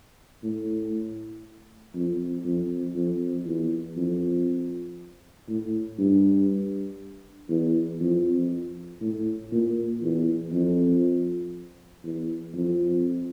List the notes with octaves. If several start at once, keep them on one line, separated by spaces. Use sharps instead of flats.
A2
F2
F2
F2
E2
F2
A2
G2
E2
F2
A2
A#2
E2
F2
E2
F2